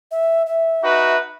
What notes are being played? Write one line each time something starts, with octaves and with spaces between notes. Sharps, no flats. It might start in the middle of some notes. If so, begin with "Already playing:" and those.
E5
E5
D#4 F#4 B4